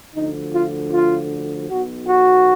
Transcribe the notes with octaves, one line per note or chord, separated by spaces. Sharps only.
D2 D3 F3 D#4
F4
F4
B1 B2 F#4
F#4